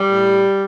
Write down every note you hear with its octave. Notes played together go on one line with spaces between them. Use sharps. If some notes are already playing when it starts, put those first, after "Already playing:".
Already playing: G3
A2